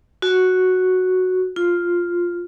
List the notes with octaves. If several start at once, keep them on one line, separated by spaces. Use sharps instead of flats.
F#4
F4